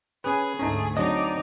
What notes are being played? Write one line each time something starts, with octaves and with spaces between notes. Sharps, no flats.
C#4 G#4 B4
D2 G#2 A3 C#4 D#4 A#5
F#3 C4 D4 D#4 D5 D#5